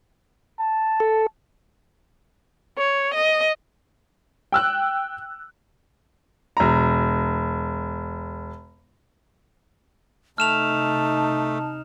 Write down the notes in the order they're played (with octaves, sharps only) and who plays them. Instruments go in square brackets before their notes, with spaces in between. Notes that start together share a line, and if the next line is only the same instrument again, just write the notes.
[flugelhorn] A5
[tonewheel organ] A4
[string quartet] C#5
D#5
[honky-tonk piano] G5 E6 F#6
[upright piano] E1 A#5
[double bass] C3 D#4 [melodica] A3 [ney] A5 [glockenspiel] F6 E7 F7